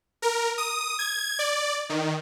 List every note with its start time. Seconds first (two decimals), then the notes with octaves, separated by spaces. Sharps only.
0.22 A#4
0.58 D#6
0.99 G#6
1.39 D5
1.90 D#3